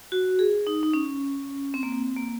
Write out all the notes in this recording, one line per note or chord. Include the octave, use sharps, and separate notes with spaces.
F#4
G#4
D#4
D#4
C#4
C4
A#3
C4
A#3